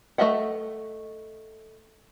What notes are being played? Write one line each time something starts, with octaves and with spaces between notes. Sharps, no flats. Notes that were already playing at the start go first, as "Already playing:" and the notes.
A3 B4 D#5 E5 F#5